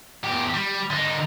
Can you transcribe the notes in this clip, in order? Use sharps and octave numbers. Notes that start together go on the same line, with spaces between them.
E2 G4
G3
D3 D#4